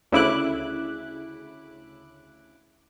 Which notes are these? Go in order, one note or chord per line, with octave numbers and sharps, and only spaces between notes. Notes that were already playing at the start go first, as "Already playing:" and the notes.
D2 C#3 E4 D6 F#6